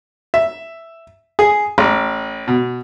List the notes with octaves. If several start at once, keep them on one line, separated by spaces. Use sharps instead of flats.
E5
G#4
A1
B2